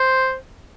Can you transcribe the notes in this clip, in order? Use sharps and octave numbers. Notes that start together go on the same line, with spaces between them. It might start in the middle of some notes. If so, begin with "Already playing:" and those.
Already playing: C5